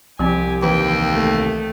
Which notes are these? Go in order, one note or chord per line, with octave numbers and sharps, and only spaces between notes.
C2 F3 C4 G4 G#5
D#2 E3 B4 G5
A3